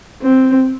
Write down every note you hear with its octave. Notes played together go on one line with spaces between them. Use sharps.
C4